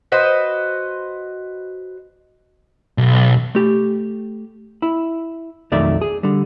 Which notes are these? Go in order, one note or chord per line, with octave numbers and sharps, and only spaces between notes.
F#4 B4 C5 D#5
B1
A3 G4
E4
B1 F2 D#3 A3 D5 E5
G#4
D3 G3